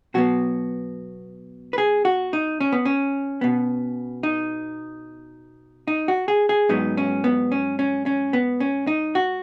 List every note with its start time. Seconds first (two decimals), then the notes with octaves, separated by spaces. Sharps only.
0.14 B2 F#3 B3 F#4
1.73 B4
1.78 G#4
2.05 F#4
2.33 D#4
2.60 C#4
2.72 B3
2.85 C#4
3.41 B2 B3
4.23 D#4
5.88 D#4
6.08 F#4
6.28 G#4
6.49 G#4
6.69 G#2 F#3 B3 D#4
6.97 C#4
7.24 B3
7.52 C#4
7.79 C#4
8.06 C#4
8.33 B3
8.60 C#4
8.87 D#4
9.15 F#4